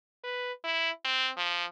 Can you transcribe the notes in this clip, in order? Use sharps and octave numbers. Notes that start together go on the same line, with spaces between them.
B4
E4
C4
F3